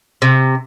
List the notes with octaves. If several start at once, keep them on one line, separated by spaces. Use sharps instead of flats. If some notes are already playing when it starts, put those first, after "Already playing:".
C3